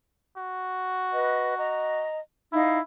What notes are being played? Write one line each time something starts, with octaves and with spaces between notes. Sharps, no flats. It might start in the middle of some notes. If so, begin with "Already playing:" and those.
F#4
B4 D#5
D#5 A#5
D#4 E4 F5